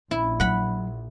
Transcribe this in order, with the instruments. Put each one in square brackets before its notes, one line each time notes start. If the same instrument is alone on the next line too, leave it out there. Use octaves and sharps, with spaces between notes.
[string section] A#1 [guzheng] E4
[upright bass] F#3 [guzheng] F#5 B5